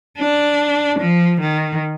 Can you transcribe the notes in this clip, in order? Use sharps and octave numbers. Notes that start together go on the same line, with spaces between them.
D4
F3
D#3